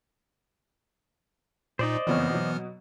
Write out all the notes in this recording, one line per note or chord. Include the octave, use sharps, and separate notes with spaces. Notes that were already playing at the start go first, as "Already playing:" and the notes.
A#2 D#4 C5 D5 D#5
F#1 F2 E3 B3 C#5 F6
B2 F#3